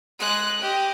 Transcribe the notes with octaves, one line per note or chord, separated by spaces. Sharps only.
G#3 F#6
G4 D#5